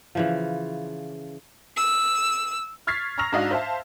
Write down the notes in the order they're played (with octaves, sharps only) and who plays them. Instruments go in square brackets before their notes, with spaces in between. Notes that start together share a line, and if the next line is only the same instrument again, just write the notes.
[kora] C#3 E3 F3
[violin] E6
[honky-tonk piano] C#6 F6 G#6 A6 B6 C7
A#5 C#6 E6 F6 A#6 F7
G#2 D4 F#4 D#5 F5
C5 E5 F5 A5